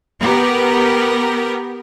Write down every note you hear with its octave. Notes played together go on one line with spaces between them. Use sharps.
B3 G4 A#4 B4